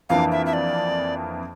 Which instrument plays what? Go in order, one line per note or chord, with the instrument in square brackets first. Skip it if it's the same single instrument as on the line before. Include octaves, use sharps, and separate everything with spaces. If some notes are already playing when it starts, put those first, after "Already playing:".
[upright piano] F2 E3 A#3 D4 [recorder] F5
[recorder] E5
E5
D5